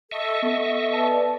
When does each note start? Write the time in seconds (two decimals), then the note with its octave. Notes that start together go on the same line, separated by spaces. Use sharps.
0.11 A4 D#5 E5 C#6
0.42 B3 A4
0.93 B4 D5 A5